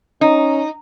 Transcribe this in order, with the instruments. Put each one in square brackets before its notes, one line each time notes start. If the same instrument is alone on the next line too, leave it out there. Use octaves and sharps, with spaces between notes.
[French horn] C#4 [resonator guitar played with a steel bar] D#4